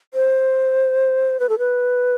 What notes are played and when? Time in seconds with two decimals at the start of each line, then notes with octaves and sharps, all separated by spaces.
0.14 C5
1.40 B4
1.49 A4
1.59 B4